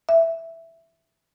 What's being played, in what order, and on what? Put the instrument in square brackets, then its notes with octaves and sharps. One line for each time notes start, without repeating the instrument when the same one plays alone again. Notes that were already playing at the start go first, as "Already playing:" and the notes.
[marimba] E5